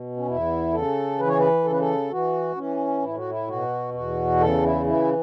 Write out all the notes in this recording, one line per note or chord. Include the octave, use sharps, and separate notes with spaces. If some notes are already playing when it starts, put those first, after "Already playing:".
Already playing: B2
C#4
E2 E4
C#3 A4
E3 B4
C#5
B4
C#3 A4
B4
A4
E3 F#4
E3 C#4
A2 E4
F#4
E4
B2 F#4
E2 F#4
C#3 A4
E4
E3 E4